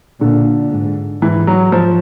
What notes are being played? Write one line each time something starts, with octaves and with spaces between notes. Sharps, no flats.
A#2 D3
G#2
G#2 E3
F#3
F3